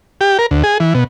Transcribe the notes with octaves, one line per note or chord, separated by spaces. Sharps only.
G4
A#4
D2
G#4
E3
B2